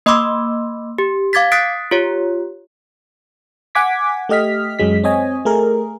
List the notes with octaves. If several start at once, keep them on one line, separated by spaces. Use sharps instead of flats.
A#3 D#5 B5 C6 D6 E6
G4
F5 D6 G#6 A6 B6
D#6 F#6 A6 B6 C7 D7
F4 G4 C#5
F#5 G#5 D6 G#6 B6
A3 G4 D#5 F6 B6
F#2 F#3 G#3 B6
C4 C#5 D#5 G#5
A3 G#4 A#4